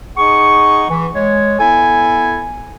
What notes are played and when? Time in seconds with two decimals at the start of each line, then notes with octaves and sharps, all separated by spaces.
0.17 D#4 G#4 F#5 C#6
0.90 E3
1.15 G#3 C#5
1.59 B3 E4 A4 G#5